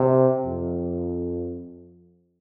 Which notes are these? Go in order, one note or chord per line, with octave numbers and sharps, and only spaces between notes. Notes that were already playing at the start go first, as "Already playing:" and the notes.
Already playing: C3
F2